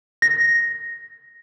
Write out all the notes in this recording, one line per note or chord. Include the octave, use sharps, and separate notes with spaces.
A#6